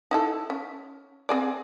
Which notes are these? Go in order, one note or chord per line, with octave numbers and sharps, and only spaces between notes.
D#4 E4 A4
C#4
C4 G#4 D5